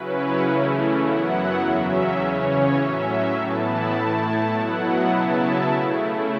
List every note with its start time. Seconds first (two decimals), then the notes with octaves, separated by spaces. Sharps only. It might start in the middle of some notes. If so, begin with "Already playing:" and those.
Already playing: C#3 F#3 C#4 E4 B4
0.12 C#5
0.42 C#3 E3 A3 C#4 E4
1.00 F#2 F#3 B3 E4 F#5
1.59 E2 C#3 F#3 C#4 E5
2.17 C#3 E3 C#4 C#5
2.75 A2 F#3 C#4 E5
3.33 A2 E3 B3 E4 A5
3.63 B5
3.91 A2 A3 E4 A5
4.50 B2 F#3 B3 E4 F#5
5.08 C#3 F#3 B3 E4 A5
5.37 E5
5.67 C#3 A3 E4